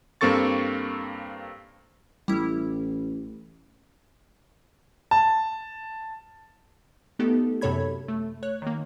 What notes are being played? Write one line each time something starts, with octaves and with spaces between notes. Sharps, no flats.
G2 A#3 C4 A4 C#6 A6
A1 G3 E4
A5
A3 B3 D#4 G4 A4
F#2 C3 A4 C#5 B5 G#6
A3
C#5 F#6
D#3 A#3